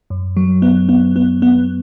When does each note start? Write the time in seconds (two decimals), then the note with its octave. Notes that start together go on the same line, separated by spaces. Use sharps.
0.10 F#2
0.37 F#3
0.62 B3
0.89 B3
1.16 B3
1.42 B3